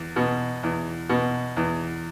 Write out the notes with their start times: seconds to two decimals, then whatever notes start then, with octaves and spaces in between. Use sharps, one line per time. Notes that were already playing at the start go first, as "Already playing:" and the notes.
Already playing: E2
0.16 B2
0.63 E2
1.09 B2
1.57 E2